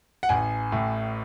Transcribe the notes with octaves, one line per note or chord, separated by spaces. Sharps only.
F#5
A1 G#5
A2